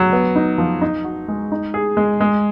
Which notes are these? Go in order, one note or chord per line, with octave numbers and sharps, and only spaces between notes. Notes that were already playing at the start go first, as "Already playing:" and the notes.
Already playing: F#3
B3
D#4
F3
D#4
F#4
G#3
D#4
G#4
G#3
G#3